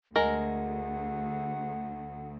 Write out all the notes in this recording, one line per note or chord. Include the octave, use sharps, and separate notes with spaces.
D2 G#3 A#4 F#5